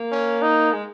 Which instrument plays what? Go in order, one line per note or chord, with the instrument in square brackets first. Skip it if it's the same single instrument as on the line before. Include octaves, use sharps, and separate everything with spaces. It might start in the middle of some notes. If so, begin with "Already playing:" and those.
Already playing: [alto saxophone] A#3
[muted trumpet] C#4
D#4
[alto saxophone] G#3